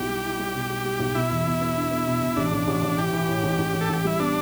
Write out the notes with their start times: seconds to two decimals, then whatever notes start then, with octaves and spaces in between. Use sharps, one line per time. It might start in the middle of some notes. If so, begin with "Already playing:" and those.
Already playing: B1 E4 G4
0.09 G3
0.24 E4
0.39 G3
0.55 B2
0.69 G3
0.85 G3
0.99 B1
1.15 B2 E4
1.30 E2
1.46 B2
1.61 B3
1.76 D4
1.91 B3
2.07 B2
2.22 B2
2.36 A1 D4
2.52 A1
2.67 A1
2.83 A1
2.98 E3 G4
3.13 E3
3.29 A2
3.43 A1
3.59 A1
3.74 A1
3.81 A4
3.89 A1 G4
4.04 G3 E4
4.20 B3 D4